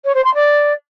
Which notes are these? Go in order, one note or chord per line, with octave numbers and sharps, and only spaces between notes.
C#5
C5
C6
D5